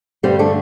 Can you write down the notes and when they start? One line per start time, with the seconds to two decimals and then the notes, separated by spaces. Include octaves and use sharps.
0.23 G2 D3 G3 C4
0.39 A3 D4